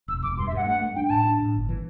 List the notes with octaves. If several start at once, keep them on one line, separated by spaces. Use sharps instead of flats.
E1 E6
E1 D6
G2 C6
E5
G2 F#5
A3 F#5
A3
D4 G5
G5
A2 A5
D4
A2
G1
E3